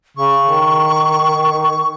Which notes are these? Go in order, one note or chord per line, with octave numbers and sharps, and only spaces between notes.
C#3 C#6
D#3